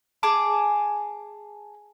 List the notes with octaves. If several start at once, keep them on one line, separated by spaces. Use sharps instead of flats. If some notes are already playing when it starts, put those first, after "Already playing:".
G#4 A5 D6